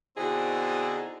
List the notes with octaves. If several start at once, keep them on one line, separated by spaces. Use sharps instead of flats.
B2 D3 C4 D#4 E4 G#4